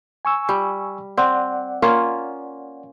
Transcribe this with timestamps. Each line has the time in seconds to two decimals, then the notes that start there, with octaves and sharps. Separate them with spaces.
0.25 G#5 C#6 E6
0.49 G3
1.17 C4 D5 F#5
1.82 A#3 C#4 F4